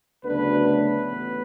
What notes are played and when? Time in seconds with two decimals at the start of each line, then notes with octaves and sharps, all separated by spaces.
0.25 D2 C#3 F#3 A3 B3 D4 B4
0.69 B3 B4
1.13 A1